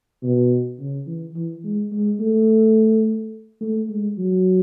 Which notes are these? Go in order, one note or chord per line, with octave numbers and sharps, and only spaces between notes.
B2
C#3
E3
E3
G#3
G#3
A3
A3
G#3
F#3